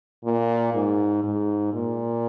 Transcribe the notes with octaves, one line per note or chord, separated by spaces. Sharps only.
A#2
G#2
G#2
A#2